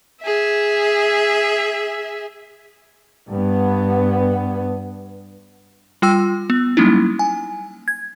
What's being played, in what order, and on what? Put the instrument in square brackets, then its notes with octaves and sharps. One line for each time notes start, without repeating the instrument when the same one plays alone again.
[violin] G#4 E5
[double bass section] G2 B3
[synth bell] G3 F4 G5 E6
B3
F#3 G3 A#3 C#4 D#4 E4
G#5
G#6